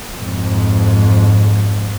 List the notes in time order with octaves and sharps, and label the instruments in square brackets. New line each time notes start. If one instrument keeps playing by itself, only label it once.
[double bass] F2 G#2